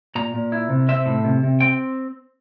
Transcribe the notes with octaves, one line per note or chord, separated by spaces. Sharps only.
A#2 A#5
A#2
E4
C3
C4 E5
A2
C3
C3
C4 G5